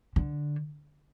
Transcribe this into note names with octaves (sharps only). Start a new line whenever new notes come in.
D3